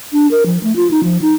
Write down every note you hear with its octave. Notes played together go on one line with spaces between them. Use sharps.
D4
A#4
F3
A3
F4
D#4
F3
D#4